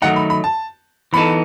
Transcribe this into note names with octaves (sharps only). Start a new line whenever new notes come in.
D#3 F#3 A3 D#4 F#5
B5
B5
A5
E3 B3 D#4 A4 B5